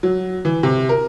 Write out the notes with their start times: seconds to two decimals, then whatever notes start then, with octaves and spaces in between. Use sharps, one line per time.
0.03 F#3
0.45 E3
0.63 C3
0.89 A#4